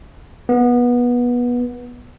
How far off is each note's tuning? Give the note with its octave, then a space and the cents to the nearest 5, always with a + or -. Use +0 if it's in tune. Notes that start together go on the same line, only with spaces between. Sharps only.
B3 -20